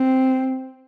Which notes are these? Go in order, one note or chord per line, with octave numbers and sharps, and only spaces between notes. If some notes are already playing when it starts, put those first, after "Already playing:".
Already playing: C4